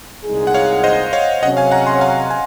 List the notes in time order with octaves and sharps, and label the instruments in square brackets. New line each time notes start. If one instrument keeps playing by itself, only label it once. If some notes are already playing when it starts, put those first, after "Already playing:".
[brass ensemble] C2 A#2 G#3 D#4 G#4
[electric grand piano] F#5
C#5 F5
C5 D#5
C#5 F5
[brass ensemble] C3 F#3 C#4 G#4 [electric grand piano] D#5 F#5
[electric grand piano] F5 G#5
F#5 A#5
G#5 C6
F5 G#5
G#5